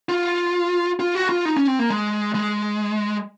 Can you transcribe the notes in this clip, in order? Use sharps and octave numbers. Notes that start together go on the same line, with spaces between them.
F4
F4
F#4
F4
D#4
C#4
C4
A#3
G#3
G#3